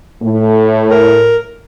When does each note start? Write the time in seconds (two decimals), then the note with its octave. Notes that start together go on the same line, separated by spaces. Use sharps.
0.22 A2 A3
0.90 A#4